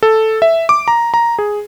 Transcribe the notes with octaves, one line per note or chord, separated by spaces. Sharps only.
A4
E5
D6
A#5
A#5
G#4